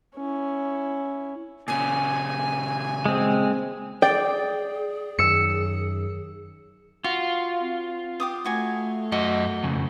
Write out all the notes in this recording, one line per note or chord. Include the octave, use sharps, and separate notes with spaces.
C#4 E4
A#2 C#3 G#5
G#3 C4
G#4 D5 G5
F#2 D#3 E6 C#7
F4 F#4
C4
G4 D6 D#6
A3 E4 F#4 G#5
F#2 F#4 D#5
F2 C#3